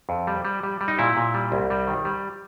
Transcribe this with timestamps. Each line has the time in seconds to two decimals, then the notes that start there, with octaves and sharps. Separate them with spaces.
0.09 F2
0.27 G3
0.45 G3
0.63 G3
0.81 G3
0.88 D#4
0.99 A#2 E4
1.17 A#2
1.34 G3
1.52 C2
1.70 G3
1.87 D#3
2.05 G3